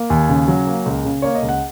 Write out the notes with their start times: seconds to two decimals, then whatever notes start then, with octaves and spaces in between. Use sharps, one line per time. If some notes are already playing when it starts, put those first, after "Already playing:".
Already playing: A#3
0.10 D#2 G#5
0.29 C#3
0.48 F#3
0.67 A#3
0.86 C#2
1.05 C#3
1.22 A#3 C#5
1.35 D#5
1.42 C#2
1.49 F#5